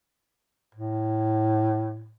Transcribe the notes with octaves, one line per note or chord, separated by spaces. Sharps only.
A2